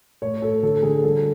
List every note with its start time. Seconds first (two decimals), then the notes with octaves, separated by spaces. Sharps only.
0.22 A2 C#5
0.42 A2 A4
0.63 D3 A4
0.83 D3 G#4
1.04 G3 A4